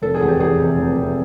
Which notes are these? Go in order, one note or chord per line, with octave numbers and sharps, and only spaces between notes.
F1 A4
G#4
E2
G4
E2 G#4
C3
F1
C3